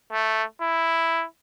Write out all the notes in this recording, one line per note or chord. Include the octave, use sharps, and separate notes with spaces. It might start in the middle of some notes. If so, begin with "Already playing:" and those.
A3
E4